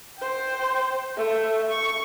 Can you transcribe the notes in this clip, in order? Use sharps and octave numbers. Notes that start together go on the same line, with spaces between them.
C5 G5
A3 E5
C#6